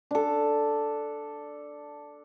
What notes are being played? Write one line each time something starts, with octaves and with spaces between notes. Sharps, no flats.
D4 A4